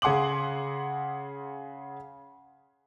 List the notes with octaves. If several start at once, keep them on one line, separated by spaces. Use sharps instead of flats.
C#3 G#4 F#5 C6 D6 F#7